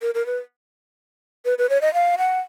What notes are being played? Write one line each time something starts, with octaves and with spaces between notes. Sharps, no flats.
A#4
A#4
B4
B4
B4
C#5
D#5
F5
F#5